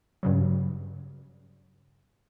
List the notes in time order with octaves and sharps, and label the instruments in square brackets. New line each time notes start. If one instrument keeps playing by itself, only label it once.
[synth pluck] G2 C#3 F#3